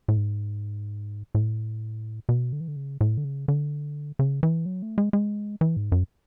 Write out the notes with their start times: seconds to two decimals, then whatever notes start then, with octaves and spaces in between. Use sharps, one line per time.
0.08 A2
0.17 G#2
1.35 A2
2.29 B2
2.53 D3
2.60 E3
2.68 D3
2.76 C#3
3.01 A2
3.17 D3
3.25 C#3
3.48 D3
4.19 C#3
4.43 E3
4.66 F#3
4.82 A3
4.98 G#3
5.13 G#3
5.61 E3
5.77 G#2
5.92 F#2